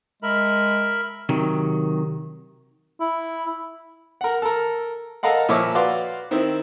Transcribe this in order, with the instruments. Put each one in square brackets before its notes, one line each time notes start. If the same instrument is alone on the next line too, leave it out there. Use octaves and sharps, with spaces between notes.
[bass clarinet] G#3 [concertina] A#4 E5 B5
[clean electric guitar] C3 D#3 F#3
[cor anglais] E4
[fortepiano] A#4 F#5
A4 A#4
A4 A#4 D#5 F5 F#5
A#2 F3 C#5 E5 D6 E6
F#4 B4 D5 F5 C6 D6
D#3 C4 E4